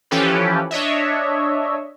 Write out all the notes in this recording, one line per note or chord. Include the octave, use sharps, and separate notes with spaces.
E3 F3 C#4 G4 A4 B4
D4 C#5 D#5 E5